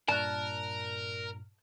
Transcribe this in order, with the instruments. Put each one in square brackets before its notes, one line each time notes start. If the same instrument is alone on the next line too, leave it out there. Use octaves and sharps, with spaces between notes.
[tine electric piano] G2 A#2 [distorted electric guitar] A#4 [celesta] D5 F#6 [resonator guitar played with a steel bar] A5